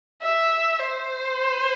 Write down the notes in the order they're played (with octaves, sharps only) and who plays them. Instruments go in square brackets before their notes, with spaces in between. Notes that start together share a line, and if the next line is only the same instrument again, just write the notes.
[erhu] E5
C5